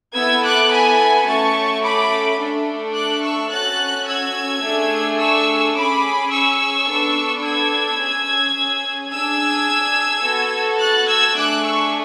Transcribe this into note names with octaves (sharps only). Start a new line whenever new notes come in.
B3 E4 A4 E6 G#6
D6 F#6
G#5 B5
A3 C#4 F#4 A5 C#6
B5 D6
A3 D4 A4
D6 F#6
C#6 E6
C#4 F#4 A4 F#6 A6
E6 G#6
A3 D4 G#4
C#6 E6
C#4 G#4 B5 D6
C#6 E6
B3 D4 A4
E6 G#6
C#4 G#4
D4 G#4 E6 G#6
B3 F#4 A4
F#6 A6
E6 G#6
A3 D4 G#4 D6 F#6
C#6 E6